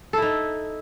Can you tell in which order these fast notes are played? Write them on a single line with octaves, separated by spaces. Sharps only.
A4 E4 D#4